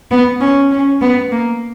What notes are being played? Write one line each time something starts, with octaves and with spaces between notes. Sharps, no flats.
B3
C#4
C#4
B3
A#3